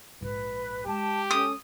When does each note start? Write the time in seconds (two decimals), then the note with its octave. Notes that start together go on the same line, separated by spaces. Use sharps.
0.21 A#1 G#2 B4
0.86 G#3 G4 A5
1.31 C#4 A4 D#6